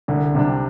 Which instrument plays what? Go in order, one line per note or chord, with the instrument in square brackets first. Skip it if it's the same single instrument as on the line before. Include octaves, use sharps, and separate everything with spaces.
[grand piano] C2 [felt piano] D3
[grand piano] C3 G3 D4